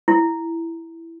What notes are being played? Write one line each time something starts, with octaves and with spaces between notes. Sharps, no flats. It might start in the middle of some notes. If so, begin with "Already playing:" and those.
E4